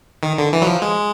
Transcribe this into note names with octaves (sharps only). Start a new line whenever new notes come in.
D#3
D3
E3
F#3
F3
G#3